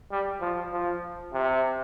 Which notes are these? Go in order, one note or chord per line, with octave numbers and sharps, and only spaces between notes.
G3
F3
F3
C3